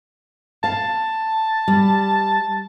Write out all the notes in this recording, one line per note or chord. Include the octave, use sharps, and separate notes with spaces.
F5 A5
G3